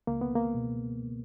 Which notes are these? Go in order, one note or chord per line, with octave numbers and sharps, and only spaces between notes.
C#2 A#3
B3
A#3
B2